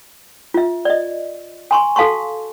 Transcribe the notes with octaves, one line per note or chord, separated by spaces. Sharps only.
F4 E5
D5 D#5
G#5 C6 C#6
F#4 A4 F5 A5 C6 C#6